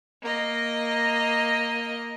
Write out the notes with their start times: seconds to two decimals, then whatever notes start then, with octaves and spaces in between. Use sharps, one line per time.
0.22 A#3 D#5